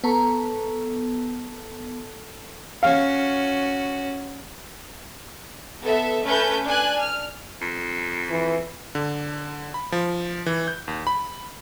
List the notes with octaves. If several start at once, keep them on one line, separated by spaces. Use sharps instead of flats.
B3 A4 A#5 C#6
C#4 F#4 F5
B3 A4 E5
A3 C#4 B4 G6
D4 G#5 F#6
F6
F2
E3
D3
B5
F3
E3
G6
D#2
B5